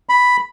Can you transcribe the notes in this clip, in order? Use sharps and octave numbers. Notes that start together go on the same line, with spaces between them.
B5